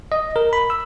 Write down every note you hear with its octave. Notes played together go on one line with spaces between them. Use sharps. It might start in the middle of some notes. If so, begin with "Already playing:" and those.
D#5
A#4
B5
E6